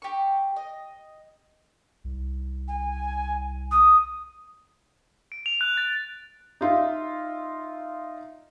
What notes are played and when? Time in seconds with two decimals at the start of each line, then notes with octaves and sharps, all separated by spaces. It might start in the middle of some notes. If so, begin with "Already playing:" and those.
0.02 G4 C#6
0.56 D#5
2.04 C2
2.68 G#5
3.71 D#6
5.32 D7
5.46 F7
5.61 F#6
5.77 A6
6.61 D#4 F4 E5